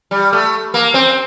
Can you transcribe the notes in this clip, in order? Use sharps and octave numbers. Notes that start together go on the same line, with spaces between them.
G3
A3
A#3
C4